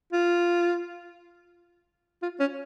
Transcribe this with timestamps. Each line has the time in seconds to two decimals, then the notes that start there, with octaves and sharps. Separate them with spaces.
0.12 F4
2.22 F4
2.40 C#4